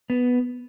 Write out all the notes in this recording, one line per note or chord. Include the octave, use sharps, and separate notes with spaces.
B3